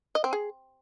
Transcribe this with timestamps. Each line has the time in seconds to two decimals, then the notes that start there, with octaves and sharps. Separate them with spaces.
0.15 D#5
0.24 C4
0.33 G#4